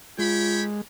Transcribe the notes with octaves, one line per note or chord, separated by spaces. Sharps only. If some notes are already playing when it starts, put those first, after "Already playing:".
G#3 F4 C#5 G5 B5